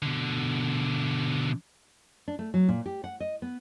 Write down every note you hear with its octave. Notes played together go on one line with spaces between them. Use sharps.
B2 D3
D4
A3
F#3
A#2
G4
F#5
D#5
B3